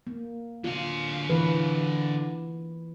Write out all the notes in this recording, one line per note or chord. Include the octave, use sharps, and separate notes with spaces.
A#3
D3 F4 F5
E3 B4